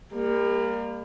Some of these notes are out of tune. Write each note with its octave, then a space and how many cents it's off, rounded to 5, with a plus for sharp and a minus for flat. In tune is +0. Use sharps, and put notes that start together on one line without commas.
G3 +35 A#3 +0